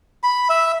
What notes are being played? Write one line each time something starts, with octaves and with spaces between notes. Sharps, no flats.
B5
E5